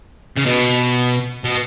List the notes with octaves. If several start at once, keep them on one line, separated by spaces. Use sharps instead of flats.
C#3
B2
B2